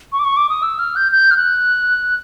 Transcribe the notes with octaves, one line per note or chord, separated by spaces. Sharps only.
C#6
D6
C#6
D6
D#6
E6
F6
G6
G6
F6
F#6